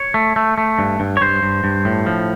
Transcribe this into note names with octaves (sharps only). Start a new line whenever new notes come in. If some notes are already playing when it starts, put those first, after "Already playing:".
Already playing: C#5
A3
A3
A3
G2
G2
C#5
G2 C5
G2
G2
A2
F3